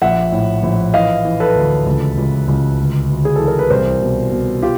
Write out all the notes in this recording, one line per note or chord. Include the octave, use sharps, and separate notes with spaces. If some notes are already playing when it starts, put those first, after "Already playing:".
A#1 E5 F#5
A2
A#1
E3 D#5 F5
E3
A4 B4
D2
C#2
C#2
C#2
D2
D2
G#4
E3 A4
A#4
B4
C2 A#4 C5
B2
B2
F4 G4